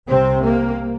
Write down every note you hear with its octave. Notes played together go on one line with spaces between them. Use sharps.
C2 C3 C4
A#3